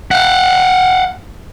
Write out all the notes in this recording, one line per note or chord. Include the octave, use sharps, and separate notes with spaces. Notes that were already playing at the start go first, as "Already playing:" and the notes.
F5 F#5